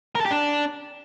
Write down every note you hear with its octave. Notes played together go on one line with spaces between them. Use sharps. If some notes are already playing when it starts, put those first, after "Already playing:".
A#4
A4
G4
D4